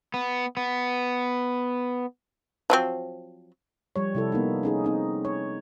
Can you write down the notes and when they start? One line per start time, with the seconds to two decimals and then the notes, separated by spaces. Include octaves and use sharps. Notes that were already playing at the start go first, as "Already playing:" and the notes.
0.14 B3
0.57 B3
2.70 F3 F#3 C4
3.96 F3 G3 C#5
4.15 C3 E4 A4
4.32 A#3 B3 D#4
4.63 C#4 D#4 G#4
4.84 C4 D#4
5.25 C#5